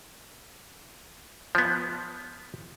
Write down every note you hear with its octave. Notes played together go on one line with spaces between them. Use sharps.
F3 B3